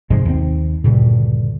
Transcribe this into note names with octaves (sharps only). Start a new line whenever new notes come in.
G#2 C3 F3 G#3
D#2 C4
D2 G2 A#2 C#3